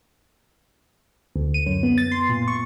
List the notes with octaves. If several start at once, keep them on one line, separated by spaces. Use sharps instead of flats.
D2
D#7
F#2
B3
A6
C6
A#2
C#6